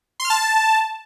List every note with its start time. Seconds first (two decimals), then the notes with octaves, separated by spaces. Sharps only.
0.20 C6
0.25 F6
0.30 A5